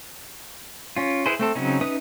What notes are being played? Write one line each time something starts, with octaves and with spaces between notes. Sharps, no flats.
C#4 F4
E4 G#4 B4 C5
A3 C4 A4
C#3 F#3 C4 C#4 D#4
C#4 D#4 B4 E5 D#6